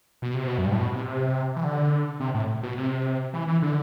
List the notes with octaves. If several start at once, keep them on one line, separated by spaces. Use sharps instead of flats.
B2
C3
B2
F#2
G2
A2
B2
C3
E3
D3
C3
A2
B2
C3
E3
E3
D3